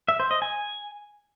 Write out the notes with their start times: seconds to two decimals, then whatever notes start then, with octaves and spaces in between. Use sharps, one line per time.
0.08 E5
0.20 C5
0.31 D#5
0.42 G#5